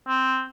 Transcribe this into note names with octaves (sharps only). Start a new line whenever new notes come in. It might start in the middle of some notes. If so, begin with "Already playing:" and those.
C4